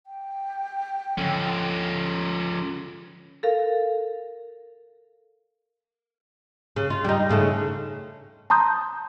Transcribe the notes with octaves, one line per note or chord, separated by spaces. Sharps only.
G5
D3 F3 C#4
A4 A#4 F5
C#3
F4
G3 D#4
G#2 C#3 A3
A5 A#5 C6 D#6 G6